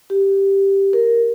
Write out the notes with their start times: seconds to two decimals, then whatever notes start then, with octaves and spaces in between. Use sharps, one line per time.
0.10 G4
0.93 A#4